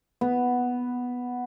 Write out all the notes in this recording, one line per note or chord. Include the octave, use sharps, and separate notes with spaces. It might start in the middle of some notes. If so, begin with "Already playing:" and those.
B3